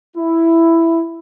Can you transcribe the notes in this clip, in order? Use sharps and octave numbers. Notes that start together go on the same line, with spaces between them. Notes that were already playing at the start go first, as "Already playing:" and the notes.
E4